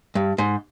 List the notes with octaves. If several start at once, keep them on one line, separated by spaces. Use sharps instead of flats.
G2
G#2